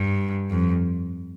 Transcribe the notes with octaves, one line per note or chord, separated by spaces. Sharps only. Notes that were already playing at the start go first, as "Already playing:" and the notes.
Already playing: G2
F2